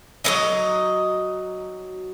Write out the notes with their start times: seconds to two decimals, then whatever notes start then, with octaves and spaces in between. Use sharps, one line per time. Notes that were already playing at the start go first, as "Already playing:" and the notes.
0.24 F#3 B3 D#4 D#5